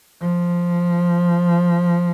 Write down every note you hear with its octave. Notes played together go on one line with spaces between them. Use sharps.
F3